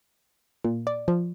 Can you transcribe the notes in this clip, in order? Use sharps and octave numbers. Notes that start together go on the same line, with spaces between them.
A#2
D5
F3